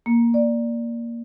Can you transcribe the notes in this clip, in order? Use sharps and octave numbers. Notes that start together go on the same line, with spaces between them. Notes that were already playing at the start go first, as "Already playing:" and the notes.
A#3
D5